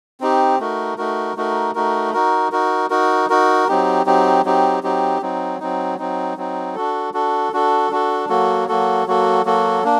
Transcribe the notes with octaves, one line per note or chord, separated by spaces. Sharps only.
C4 D#4 G4
A3 D#4 F#4 A#4
A3 D#4 F#4 A#4
A3 D#4 F#4 A#4
A3 D#4 F#4 A#4
D#4 F#4 A#4
D#4 F#4 A#4
D#4 F#4 A#4
D#4 F#4 A#4
F#3 C4 D#4 G4
F#3 C4 D#4 G4
F#3 C4 D#4 G4
F#3 C4 D#4 G4
F#3 C4 D#4
F#3 C4 D#4
F#3 C4 D#4
F#3 C4 D#4
D4 F#4 A4
D4 F#4 A4
D4 F#4 A4
D4 F#4 A4
F#3 A#3 F#4 A4
F#3 A#3 F#4 A4
F#3 A#3 F#4 A4
F#3 A#3 F#4 A4
A#3 D4